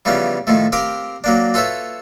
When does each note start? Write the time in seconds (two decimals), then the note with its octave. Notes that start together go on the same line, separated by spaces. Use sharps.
0.05 C#3 E3 F3 G3 B3 C#4
0.47 A2 D#3 F3 A3
0.72 C4 G4 A#4 F5
1.24 F#3 A#3 D4
1.54 F4 A4 B4 C#5 E5